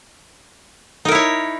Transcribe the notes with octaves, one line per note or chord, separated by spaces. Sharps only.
D#4 E4 A#4 C#5